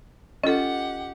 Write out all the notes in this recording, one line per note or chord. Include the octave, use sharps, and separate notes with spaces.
C#4 F4 G4 A4 D#5 F#5